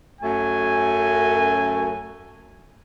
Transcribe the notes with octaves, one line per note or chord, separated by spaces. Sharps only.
F#2 A3 G#5